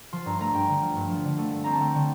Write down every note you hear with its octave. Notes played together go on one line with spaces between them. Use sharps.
F3 C6
G2 A#5
A3 A#5
G2 G5
D3
F3
G2
F3
D3
A3
A3
C4 A#5
A5
A3 G5
D3